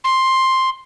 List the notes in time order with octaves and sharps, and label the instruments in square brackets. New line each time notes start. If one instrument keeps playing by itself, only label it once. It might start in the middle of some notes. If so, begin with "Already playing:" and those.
[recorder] C6